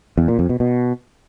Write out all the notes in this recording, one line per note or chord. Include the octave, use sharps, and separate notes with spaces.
E2
A#2
F2
B2
B2